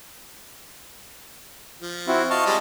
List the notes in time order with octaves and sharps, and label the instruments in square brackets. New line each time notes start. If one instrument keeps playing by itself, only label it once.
[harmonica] F3
[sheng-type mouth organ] C4 E4 F#4
[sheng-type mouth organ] D#5 A5 [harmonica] F5 C#6
[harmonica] G3 G#3